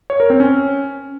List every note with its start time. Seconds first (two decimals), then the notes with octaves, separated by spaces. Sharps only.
0.10 C#5
0.20 A#4
0.30 C4
0.40 C#4